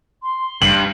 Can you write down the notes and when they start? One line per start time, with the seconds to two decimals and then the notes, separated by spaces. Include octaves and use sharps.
0.23 C6
0.62 G2 F#7